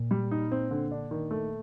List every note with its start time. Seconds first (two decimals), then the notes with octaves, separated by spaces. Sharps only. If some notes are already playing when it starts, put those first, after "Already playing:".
Already playing: A#2
0.11 G3
0.31 D#4
0.52 C4
0.71 D3
0.91 D4
1.11 D#3
1.31 A3